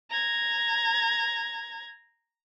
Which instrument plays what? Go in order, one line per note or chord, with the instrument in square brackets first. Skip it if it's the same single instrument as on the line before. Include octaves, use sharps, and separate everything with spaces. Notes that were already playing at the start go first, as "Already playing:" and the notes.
[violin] A#5 G#6